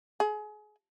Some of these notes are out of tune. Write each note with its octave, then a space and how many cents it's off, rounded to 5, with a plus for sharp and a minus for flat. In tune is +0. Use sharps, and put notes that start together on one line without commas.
G#4 +30